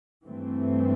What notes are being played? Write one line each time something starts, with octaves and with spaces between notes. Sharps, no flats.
G2 E3 A3 C4